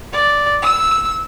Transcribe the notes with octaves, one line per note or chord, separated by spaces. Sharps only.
D5
E6